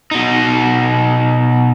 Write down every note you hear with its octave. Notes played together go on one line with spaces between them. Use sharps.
B2 D#4